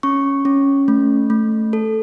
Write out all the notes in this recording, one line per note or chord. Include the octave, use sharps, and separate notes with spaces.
C#4 C#6
C#4
A3
A3
A4